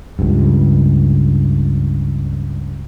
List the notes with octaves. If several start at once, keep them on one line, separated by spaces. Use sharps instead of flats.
C#2 G2